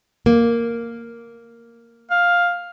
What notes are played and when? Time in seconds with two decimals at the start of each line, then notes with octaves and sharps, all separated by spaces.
0.26 A#3
2.10 F5